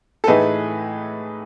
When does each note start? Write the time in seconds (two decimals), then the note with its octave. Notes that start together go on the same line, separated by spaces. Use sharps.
0.24 A4
0.27 A2 E3 A3 D#4 G#4 B4